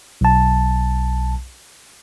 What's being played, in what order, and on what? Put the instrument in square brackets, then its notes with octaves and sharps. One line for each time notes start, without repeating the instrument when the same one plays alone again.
[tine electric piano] B1 A5